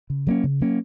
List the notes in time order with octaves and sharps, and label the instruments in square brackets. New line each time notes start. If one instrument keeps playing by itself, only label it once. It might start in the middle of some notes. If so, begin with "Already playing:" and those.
[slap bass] C#3
F#3 A#3 C#4
C#3
F#3 A#3 C#4